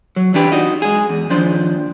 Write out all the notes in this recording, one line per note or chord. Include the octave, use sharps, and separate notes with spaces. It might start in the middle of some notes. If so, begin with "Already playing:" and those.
F#3
E3 D4 G4 B4
D#4 F#4 D#5
G#3 G#4
E2
D#2 F3 D4 C5